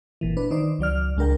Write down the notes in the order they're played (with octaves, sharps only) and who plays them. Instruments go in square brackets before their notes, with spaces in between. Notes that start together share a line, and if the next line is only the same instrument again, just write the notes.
[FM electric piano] G1 A#2 E3
D4 B4
D#3 D#4 C5 D5
C#2 F#3 D5 F6
C#2 G#3 D4 A#4 G5